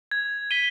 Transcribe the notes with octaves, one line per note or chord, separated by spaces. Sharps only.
G#6
B6 D#7 G7